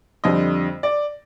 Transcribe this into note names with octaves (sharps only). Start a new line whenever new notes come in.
F2 D3 G3 D#5
D5